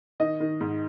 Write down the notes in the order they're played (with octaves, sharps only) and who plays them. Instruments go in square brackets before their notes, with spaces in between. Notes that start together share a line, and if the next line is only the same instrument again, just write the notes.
[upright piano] D#3 D#5
D#3
G#2